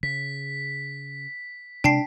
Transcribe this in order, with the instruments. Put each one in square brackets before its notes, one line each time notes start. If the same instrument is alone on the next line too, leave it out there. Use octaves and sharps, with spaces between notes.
[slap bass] C#3 [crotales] B6
[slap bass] C3 G#3 [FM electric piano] D4 [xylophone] G5 A5 C7